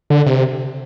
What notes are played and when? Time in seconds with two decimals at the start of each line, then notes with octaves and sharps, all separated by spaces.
0.10 D3
0.26 C3